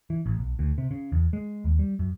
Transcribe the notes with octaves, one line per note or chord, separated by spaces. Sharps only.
E3
A1
B1
D2
C3
C#3
E2
G#3
D#2
G3
F#2